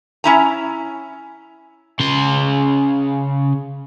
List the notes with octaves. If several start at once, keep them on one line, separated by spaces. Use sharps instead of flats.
C#4 E4 A#5
C#3 C6